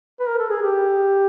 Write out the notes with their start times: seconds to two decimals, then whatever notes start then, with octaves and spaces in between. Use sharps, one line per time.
0.20 B4
0.27 A#4
0.39 A4
0.49 G#4
0.62 G4